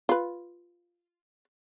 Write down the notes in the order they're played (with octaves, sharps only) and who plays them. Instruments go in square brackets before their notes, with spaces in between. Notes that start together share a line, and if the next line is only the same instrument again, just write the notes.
[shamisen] F4 B4